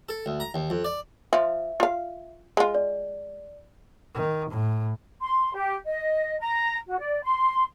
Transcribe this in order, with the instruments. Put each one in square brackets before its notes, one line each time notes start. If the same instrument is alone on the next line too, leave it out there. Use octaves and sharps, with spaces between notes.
[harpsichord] A4
D2
A#5
D#2
F2
D5
[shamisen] F3 F4 [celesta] E5
[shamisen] F4 F5
G#3 F4
[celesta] D5
[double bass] D#3
A2
[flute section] C6
G4
D#5
A#5
F#4
D5
C6